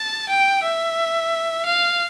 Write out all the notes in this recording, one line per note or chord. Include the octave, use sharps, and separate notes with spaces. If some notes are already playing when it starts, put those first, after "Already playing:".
Already playing: A5
G5
E5
F5